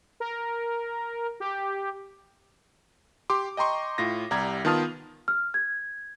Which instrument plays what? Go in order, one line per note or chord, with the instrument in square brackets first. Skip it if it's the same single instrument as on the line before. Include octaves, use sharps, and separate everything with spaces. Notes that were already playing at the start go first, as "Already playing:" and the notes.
[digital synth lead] A#4
G4
[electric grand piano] G4 C6 D6
D#5 G5 A#5 C6 C#6
A2 F4 A#6
C2 G3 G4 A#5 G#6
D#3 B3 F4 A5 D#6 F6
[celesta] F6
G#6